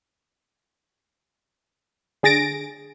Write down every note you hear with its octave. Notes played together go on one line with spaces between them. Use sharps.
D3 G#4 A6 A#6 D7